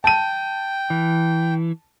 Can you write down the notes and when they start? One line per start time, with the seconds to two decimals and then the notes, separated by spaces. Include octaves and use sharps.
0.04 G5 A5 D#7
0.90 E3